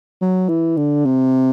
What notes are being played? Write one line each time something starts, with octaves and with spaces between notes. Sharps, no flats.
F#3
E3
D3
C3